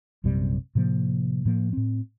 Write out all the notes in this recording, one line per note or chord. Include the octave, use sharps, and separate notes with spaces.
A#1 F#2 C3 G3
A2 C3 F3 A#3
A2 F3 A#3
A2 C4